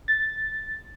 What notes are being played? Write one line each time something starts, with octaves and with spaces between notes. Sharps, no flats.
A6